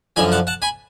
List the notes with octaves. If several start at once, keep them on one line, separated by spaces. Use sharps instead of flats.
F#2 D3 F3 G#5 B5
F#5 A5
F#5 A5
G#5 B5